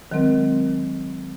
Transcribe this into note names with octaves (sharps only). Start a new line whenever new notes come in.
D#3 F#3 G#3 C4 A#4